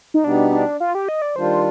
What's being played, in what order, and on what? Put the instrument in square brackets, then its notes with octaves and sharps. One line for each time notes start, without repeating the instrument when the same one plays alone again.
[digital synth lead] D#4
[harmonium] B2 G3 B3 D#4 G4 [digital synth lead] D4
[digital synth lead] D4
F4
G4
D#5
D5
[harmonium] D#3 G3 D4 F4 [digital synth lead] C5